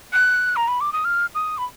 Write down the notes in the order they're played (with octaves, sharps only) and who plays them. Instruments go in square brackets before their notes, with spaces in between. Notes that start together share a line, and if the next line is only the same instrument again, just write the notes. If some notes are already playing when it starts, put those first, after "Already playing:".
[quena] F#6
A#5
B5
D6
D#6
F6
D#6
B5